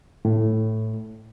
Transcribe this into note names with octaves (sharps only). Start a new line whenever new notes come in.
A2